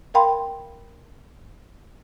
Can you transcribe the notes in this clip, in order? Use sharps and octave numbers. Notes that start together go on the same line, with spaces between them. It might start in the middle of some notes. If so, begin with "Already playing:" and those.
A#4 F5 G5 B5 C6